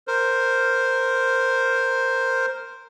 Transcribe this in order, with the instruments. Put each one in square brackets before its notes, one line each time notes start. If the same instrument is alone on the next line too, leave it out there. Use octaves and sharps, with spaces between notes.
[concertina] A#4 C5